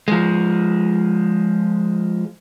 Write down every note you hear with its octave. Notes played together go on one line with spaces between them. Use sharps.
F3 G#3